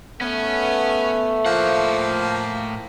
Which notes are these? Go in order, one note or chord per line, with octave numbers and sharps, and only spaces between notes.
A3 B3 C#4
A2 F3 A#3 F#5